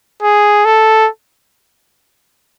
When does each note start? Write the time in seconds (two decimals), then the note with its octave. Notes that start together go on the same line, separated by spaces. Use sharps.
0.23 G#4
0.65 A4